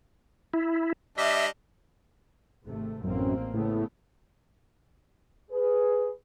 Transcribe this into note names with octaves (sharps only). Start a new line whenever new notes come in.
E4
G3 D4 D#5 E5
G#1 C3 A3
A1 F#2 A#3 C4
A2 C#3 A3 B3
G#4 B4